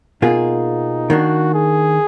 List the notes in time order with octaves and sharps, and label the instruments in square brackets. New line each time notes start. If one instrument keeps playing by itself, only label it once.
[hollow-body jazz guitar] B2 A#3 F4 G#4 [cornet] D#4
[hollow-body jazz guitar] D#3 A#3 D4 [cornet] F#4
[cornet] G#4